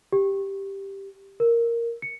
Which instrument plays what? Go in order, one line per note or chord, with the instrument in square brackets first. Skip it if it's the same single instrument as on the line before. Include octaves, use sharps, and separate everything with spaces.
[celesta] G4
A#4
C#7